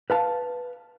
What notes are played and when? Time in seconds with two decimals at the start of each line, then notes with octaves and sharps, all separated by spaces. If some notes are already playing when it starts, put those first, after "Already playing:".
0.10 B4 F5 A5